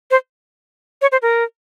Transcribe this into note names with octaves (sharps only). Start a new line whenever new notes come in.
C5
C#5
C5
A#4